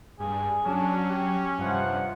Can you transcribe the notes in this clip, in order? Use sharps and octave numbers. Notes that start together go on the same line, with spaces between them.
G2 G#4
F#3 C#4 D4
G4
G2 C3 F3 F#5